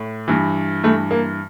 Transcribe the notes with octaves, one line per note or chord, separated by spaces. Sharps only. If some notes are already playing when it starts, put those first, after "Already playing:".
Already playing: A2
G2 E3
G2 E3 A3
A#3